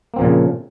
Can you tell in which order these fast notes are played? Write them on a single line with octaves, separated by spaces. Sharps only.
A#3 C4 F3 A#2 C#3